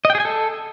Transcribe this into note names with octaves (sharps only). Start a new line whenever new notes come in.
D#5
G5
G#4
G#5
A4